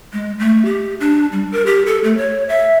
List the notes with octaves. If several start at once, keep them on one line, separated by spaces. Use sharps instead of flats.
G#3
A3
G4
D4
G3
A#4
G4
A4
A3
C#5
E5